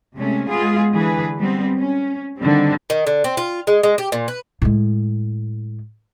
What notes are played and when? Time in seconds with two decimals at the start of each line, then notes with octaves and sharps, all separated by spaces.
0.15 C3 G#3 A3 C#4
0.49 G#3 B3 F4 G#4
0.93 D3 E3 G#4 B4
1.37 G3 G#3 B3 C4
1.79 C#4
2.38 D3 D#3 G3 C4
2.90 D#3
3.07 D3
3.24 C4
3.37 F4
3.67 G#3
3.83 G#3
3.98 G4
4.12 A#2
4.28 B4
4.62 A2 G#3